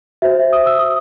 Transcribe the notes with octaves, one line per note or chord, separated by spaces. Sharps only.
F#4 C5 E5
D#6
E6
D#6